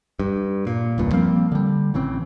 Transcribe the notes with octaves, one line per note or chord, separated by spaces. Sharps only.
G2
A#2
D#1 C2 G2 A#2
F3 G3 A#3 C4
D3 G3
A1 C#3 E3 C4